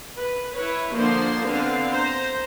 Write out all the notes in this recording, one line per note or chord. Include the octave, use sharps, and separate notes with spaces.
B4
E4 B4 C#5
D3 F3 A#3 C5 C6
D3 B3 C4 D4 F5
C5 A#5